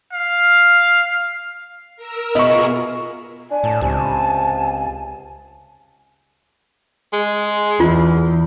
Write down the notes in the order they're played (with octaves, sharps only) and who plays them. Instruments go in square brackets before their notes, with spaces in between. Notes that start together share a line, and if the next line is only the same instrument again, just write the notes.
[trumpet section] F5
[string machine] A#4 E6
[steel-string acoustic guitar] B2 B4 E5 [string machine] F4 G#4 A#4 [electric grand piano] D#5 C#6
[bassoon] D4 [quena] G#5
[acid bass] A2 [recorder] A5
[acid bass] C#2 [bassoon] C3
[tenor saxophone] G#3
[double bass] E2 [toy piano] F4